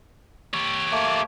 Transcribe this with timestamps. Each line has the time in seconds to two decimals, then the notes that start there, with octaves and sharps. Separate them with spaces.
0.54 G4 C#5
0.92 A3 A#3